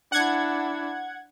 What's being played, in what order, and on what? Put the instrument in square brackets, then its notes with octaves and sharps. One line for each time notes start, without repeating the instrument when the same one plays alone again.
[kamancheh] D4 E4 [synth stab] F#5 G#6